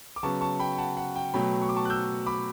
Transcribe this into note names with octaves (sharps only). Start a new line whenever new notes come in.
D6
C#3 F#3 B3 A5 C#6
A5 C#6
G5 B5
F#5 A5
F#5
G5
B2 F#3 A3 G5 B5
C#6
D6
A5 C#6
F#6
E6 G6
B5 D6